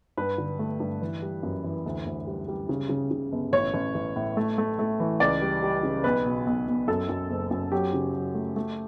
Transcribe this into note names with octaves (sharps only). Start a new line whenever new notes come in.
G2 B4
D3
A3
G2
E3
G3
F#2
E3
D2
D2
G3
G3
C#3
C#3
C#3
G1
A1 C#5
A1
A1
A2
A3
A3
A3
E3
C#2 D5
G3
G3
C#3
B1 B4
B2
B1
B1
F#2 A4
F#2
F#1
F#2
F#3 G4
C#3
F#3
A3
A3